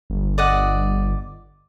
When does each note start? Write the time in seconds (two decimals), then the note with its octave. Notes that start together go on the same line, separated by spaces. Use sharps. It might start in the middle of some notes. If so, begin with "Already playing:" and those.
0.10 G1
0.38 D5 D#5 F#5